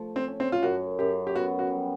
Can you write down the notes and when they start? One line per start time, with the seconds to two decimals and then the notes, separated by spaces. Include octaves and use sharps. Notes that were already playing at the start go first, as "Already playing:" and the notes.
Already playing: F3 A3
0.16 C4
0.28 C#4
0.40 C4
0.52 F4
0.63 F#2 F#4
0.99 F#2 G4
1.27 G4
1.35 B3 F#4
1.59 F#4
1.71 G3